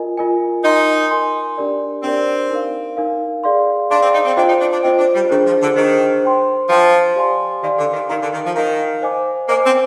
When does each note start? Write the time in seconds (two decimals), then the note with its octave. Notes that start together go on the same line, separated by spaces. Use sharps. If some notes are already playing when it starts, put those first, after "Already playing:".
Already playing: F4 A#4 D#5 G#5
0.17 F4 A#4 D#5 G#5
0.64 D#4 A#4 D#5 G#5 C6
1.11 A#4 D#5 G#5 C6
1.58 D4 G4 A#4 D5
2.03 C4 D4 G4 A#4 D5
2.50 D#4 A#4 F5
2.97 D#4 A#4 F5
3.44 G#4 D5 F5 C6
3.90 D4 G#4 D5 F5 C6
4.01 C4
4.13 D#4
4.25 C4
4.37 D4 F4 C5 D#5 G5
4.48 D#4
4.60 D4
4.72 D4
4.83 C4 F4 C5 D#5 G5
4.99 D4
5.14 G3
5.29 D#3 D4 G#4 C5
5.46 F3
5.61 D3
5.76 D#3 D4 G#4 C5
6.23 C5 G5 C6
6.70 F3 C5 G5 C6
7.16 G4 D5 F5 G#5 C6
7.62 D#3 G4 D5 F5 G#5 C6
7.78 D3
7.93 D#3
8.09 D#3 D#4 A#4 F5 A#5
8.21 D3
8.33 D#3
8.44 F3
8.55 D#3 D#4 A#4 F5 A#5
9.02 C5 D#5 G#5 D6
9.49 A#3 C5 D#5 G#5 D6
9.65 C4